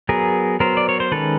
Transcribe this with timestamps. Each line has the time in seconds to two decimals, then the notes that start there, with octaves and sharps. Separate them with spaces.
0.09 F#3 B3 G#4 A#4
0.60 F#3 B3 A#4 C5
0.77 D5
0.89 C#5
1.00 C5
1.12 D#3 G#3 C#4 A4 B4